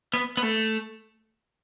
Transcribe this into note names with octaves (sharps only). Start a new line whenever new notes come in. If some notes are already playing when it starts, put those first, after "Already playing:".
B3
B3
A3